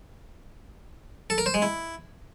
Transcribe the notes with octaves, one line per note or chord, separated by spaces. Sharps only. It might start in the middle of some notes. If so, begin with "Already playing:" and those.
A4
A#4
C5
G#3
E4